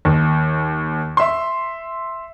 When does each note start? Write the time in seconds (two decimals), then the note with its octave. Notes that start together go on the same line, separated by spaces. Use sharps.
0.05 D#2
1.17 E5 C6